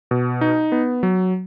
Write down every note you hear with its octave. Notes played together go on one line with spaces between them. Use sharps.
B2
D#4
B3
F#3